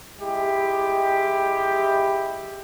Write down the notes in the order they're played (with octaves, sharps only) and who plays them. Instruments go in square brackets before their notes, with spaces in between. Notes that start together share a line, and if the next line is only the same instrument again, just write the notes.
[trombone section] G#3 E4 G4